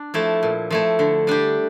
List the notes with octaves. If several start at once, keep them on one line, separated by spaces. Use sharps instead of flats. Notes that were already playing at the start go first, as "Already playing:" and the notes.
Already playing: D4
F3 A3 E4
A#2
F3 A3 E4
D3
G3 D4 G4